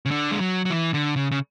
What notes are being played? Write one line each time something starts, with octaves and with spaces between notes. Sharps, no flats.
C#3
D3
G#3
F#3
F#3
E3
D3
C#3
C#3